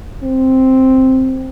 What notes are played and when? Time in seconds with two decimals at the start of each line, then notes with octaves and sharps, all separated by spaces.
0.24 C4